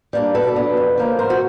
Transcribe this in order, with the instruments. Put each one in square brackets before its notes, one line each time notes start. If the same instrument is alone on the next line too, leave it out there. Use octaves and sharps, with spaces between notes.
[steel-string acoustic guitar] G3 A#3 D4
B2 A4 B4
F#3 B3 D4
F2
C#3 F3 A#3
G#2 A#4 C5
F#4